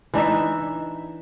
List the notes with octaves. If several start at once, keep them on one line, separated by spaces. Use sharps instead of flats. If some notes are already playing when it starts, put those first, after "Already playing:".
E3 D4 D#4 E5